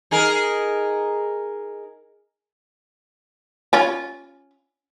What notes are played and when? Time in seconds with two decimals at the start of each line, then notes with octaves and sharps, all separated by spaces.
0.11 D#4 G#4 A#4
3.73 C#4 F4